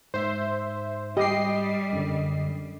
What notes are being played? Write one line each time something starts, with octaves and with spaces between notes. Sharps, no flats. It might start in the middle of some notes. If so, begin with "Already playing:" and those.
G#2 C5 E5
G3 G4 D#5 C7
F#2 D3